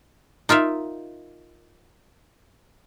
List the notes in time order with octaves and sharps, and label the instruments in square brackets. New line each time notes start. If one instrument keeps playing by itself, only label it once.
[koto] D#4 F4 A#4 E5